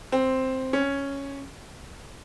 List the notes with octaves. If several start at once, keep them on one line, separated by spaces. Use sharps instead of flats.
C4
C#4